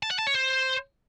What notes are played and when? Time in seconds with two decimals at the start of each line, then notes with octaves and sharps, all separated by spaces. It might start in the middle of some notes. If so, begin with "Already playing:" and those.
0.03 A5
0.11 F#5
0.19 A5
0.27 C#5
0.35 C5